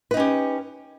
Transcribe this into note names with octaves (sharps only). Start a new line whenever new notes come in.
C#4 D#4 G4 B4